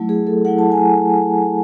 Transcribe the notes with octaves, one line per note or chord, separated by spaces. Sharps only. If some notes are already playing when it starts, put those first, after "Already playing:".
Already playing: F#3 A3 E4
G#4
A4
F#3 A3 E4 F#5
A5
G#5